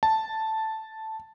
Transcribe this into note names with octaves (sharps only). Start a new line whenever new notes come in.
A5